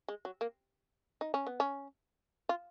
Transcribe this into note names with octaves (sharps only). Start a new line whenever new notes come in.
G#3
F#3
A#3
D#4
C#4
B3
C#4
F4